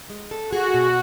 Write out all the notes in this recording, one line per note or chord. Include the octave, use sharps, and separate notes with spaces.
G#3
A4
F#4 G#4
B2